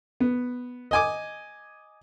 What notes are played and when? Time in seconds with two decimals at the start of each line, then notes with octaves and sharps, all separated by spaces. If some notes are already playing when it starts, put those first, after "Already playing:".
0.20 B3
0.91 D#5 G#5 D6